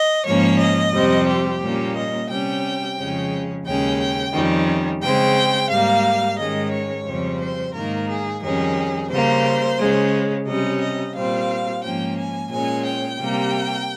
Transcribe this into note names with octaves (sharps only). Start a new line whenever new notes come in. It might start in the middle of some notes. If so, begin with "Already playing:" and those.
Already playing: D#5
G#2 F3 A#3 C#4 C#5
D#5
F2 C3 G3 C4
G4
A#2 G3 A#3 C#4
D#5
C3 G3 C#4 G5
F2 C#3 F3 G#3 C#4
D#2 C#3 G#3 C#4 G5
G5
F2 D#3 G3 C#4
C#3 G#3 C4 G5
G#2 G3 A#3 F5
G#2 D#3 G#3 C#4 D#5
C#5
F2 C#3 G3 C4
C5
G#2 D#3 A#3 A#4
G#4
F2 D#3 G3 C#4 G#4
C#3 G3 A#3 C5
C#3 G#3 C#4
C3 G3 C#4 D#5
D#5
A#2 G3 C4 F5
G#2 F3 A#3 C#4 G5
G#5
A#2 G#3 C#4 G#5
G5
C3 G3 A#3